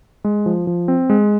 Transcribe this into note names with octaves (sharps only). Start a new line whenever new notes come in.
G#3
F3
F3
C4
G#3